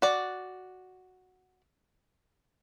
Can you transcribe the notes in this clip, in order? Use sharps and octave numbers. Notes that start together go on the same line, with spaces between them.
F#4 D5